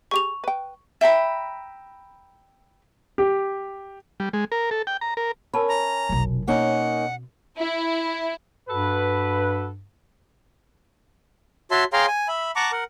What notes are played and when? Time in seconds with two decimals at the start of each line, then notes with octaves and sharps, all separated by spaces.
0.11 G4 G#4 C#6 F7
0.44 B4 G5
1.01 E5 G5 A#5 B5
3.18 G4
4.20 G3
4.33 G#3
4.52 A#4
4.71 A4
4.87 G5
5.01 A#5
5.17 A#4
5.54 C#4 A#4 A5 B5
5.69 A#5
6.09 F1 B1
6.48 B2 A#3 C4 C#4 D#4 F#5
7.56 E4
8.69 G2 F#4 A4 B4
11.71 F#4 C#5 E5 A5 C6
11.93 G#4 C#5 F5 G5 A#5 C6
12.08 G#5
12.28 E5 B5
12.56 F#5 A5 A#5 C#6 D6
12.72 A#4 F#5